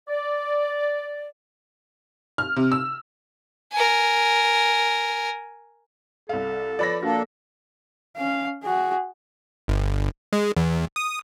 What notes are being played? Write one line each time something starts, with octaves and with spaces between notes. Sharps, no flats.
D5
F6
C3
E6
A#4 G#5
C2 A4 F5
F3 B4 C#5 D5 B5 A#6
A#3 D4 F#4 A4
C#4 F5
F#4 G#4
G1
G#3
E2
D#6